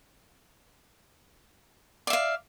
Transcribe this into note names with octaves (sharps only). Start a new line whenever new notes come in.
D5 E5 F5